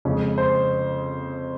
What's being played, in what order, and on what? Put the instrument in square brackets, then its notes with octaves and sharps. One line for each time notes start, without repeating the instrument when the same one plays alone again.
[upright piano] F2 C#3 G#3 C#4
C5